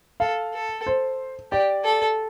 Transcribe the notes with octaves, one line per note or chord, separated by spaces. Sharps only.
A4 F5
A4
C5
G4 D5
A4